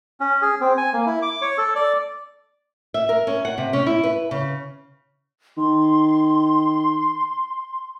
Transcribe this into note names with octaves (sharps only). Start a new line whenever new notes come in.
C#4
G#4
C4
G#5
A#3
E4
D6
C#5
A4
D5
E5
A#4
C#4
F#5
C3
C#4
E4
B4
C#3
D#3 C6